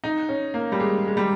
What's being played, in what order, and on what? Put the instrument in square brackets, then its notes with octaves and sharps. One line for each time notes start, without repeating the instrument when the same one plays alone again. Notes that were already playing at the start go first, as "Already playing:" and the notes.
[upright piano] D#4
C#4
A#3
G3
G#3
G#3
G3